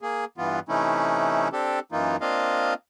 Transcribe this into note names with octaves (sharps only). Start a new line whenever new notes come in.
A#3 G#4
G2 E3 B3 F4
C3 E3 A3 C#4 D#4 E4
C4 D4 G4 A4
F#2 E3 A#3 D#4 F4
A#3 C4 D4 F4 D#5 F5